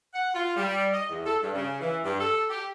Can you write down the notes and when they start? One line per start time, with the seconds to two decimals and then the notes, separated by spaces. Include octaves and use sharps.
0.14 F#5
0.34 F4
0.57 G3
0.94 D#5
1.10 E2
1.26 A4
1.42 G2
1.54 C#3
1.81 E3
2.04 G2
2.20 A4
2.50 G4